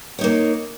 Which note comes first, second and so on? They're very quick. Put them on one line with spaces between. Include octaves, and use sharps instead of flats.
C#5 D#4 A#3